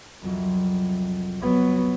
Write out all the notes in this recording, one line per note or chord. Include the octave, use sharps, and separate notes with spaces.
C2 F2 F#3
F#3 B3